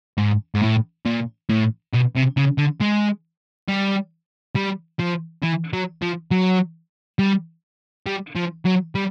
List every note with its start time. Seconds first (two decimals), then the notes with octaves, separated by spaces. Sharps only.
0.18 G#2
0.55 G#2
0.62 A2
1.06 A#2
1.49 A2
1.93 B2
2.15 C3
2.37 C#3
2.58 D3
2.81 G#3
3.68 G3
4.56 G3
4.99 F3
5.43 E3
5.73 F#3
6.02 F3
6.31 F#3
7.19 G3
8.06 G3
8.35 F3
8.65 F#3
8.95 G3